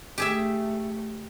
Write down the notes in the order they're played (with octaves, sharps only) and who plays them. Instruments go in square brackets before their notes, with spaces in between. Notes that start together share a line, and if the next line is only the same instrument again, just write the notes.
[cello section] A3 [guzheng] G4 G#4 E5